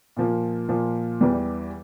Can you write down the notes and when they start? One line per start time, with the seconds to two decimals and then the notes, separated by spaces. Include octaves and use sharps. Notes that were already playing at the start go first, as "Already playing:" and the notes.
0.16 A#2 F3 A#3
0.69 A#2 F3 A#3
1.21 E2 E3 G3